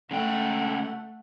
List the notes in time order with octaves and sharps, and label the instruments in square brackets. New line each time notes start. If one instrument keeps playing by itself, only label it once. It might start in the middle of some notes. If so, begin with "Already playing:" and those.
[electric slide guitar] C#3 G#3 G5 [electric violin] A3 F#5